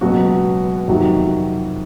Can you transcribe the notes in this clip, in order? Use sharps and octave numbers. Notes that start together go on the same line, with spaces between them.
C#2 B2 F#3 F#4
F2 C3 D#3 F#3